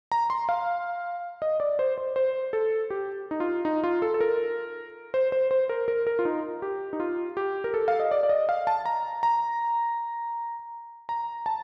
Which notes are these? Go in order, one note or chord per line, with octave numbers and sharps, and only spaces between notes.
A#5
C6
F5
D#5
D5
C5
C5
C5
A4
G4
D#4
F4
D#4
F4
A4
A4
A#4
C5
C5
C5
A#4
A#4
A#4
F4
D#4
G4
D#4
F4
G4
A#4
A4
F5
D#5
D5
D5
D#5
F5
A5
A#5
A#5
A#5
A5